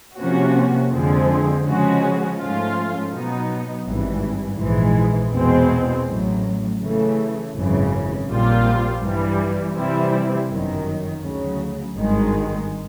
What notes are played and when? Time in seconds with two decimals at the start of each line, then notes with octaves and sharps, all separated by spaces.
0.17 C3 F3 A#3 C#4 F#4
0.92 F2 D3 F3 G#3 C4
1.65 C#3 F3 G#3 C#4 F#4
2.38 G#2 F3 A3 C#4 F4
3.12 B2 F#3 B3 D#4
3.86 G#1 G2 E3
4.59 A#1 G#2 E3 G#3
5.33 E2 B2 G#3 C4
6.07 A1 A2 F#3
6.80 C#3 E3 A3
7.54 G#1 F#2 C#3 E3
8.27 A#1 A#2 G3 C4 F4
9.01 G2 E3 G3
9.75 C3 E3 G3 C4 E4
10.49 G1 F#2 D#3 F#3
11.22 D2 C#3 F#3
11.96 G#1 G2 D#3 G#3